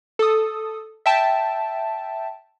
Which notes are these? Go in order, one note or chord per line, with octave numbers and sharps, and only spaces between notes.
A4 D#6
E5 G5 A5